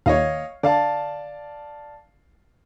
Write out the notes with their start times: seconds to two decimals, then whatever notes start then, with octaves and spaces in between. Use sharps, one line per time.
0.06 D#2 A#2 C#5 D#5 F5
0.63 D3 D5 F5 A5